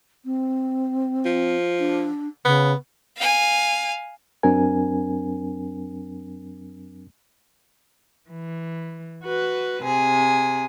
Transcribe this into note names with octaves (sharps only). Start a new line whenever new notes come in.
C4
F3
D4
C#3 B3
F5 G#5
F#2 F#3 C4 D4 A#4 G#5
E3
F#4 B4
C3 G#4